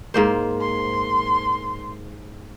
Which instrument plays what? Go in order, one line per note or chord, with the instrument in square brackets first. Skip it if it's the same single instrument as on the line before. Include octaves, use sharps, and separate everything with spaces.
[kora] G#2 A#3 C5
[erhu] C6